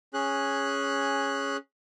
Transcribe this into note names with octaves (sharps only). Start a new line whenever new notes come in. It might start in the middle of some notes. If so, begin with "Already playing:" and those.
C#4 G#4 F#6